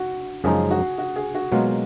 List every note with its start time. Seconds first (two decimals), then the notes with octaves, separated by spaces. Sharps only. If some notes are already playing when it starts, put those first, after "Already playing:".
Already playing: F#4
0.44 F#2 C#3 F3 G#3 D#4 G#4
0.71 F#4
0.98 F#4
1.16 G#4
1.35 F#4
1.52 B2 F#3 G#3 A#3 F4